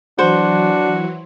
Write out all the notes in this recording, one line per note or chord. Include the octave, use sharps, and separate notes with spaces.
E3 F#3 D4 F#4 C5